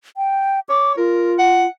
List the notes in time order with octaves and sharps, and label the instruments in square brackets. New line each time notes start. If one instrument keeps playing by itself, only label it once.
[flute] G5
[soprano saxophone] C#5 [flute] D6
[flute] F4 [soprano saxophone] A#4
[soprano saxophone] F#5